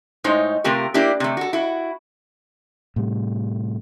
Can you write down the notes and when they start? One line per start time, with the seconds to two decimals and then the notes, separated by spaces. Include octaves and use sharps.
0.24 A2 G#3 D#4 C5 C#5
0.64 C3 A3 F4 G4 A#4
0.94 A#3 D4 E4 G4
1.20 C3 A3
1.37 F#4 A4
1.53 E4 F#4
2.96 A2 C3 G3